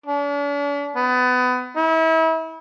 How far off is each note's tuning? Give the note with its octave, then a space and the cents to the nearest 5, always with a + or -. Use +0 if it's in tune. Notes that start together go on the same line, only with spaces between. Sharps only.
D4 -45
B3 +25
E4 -35